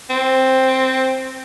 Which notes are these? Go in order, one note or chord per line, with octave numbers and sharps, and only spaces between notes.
C4